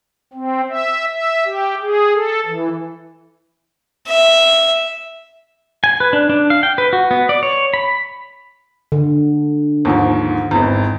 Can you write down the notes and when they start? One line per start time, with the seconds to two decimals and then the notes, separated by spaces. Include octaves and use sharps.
0.34 C4
0.69 E5
1.12 E5
1.46 G4
1.82 G#4
2.14 A4
2.46 E3
4.09 E5
5.84 G#5
6.00 B4
6.13 D4
6.29 D4
6.50 F5
6.63 G5
6.78 B4
6.93 F#4
7.11 B3
7.29 D5
7.43 C#5
7.74 B5
8.92 D3
9.85 D#2 G#2 F3
10.51 G#1 E2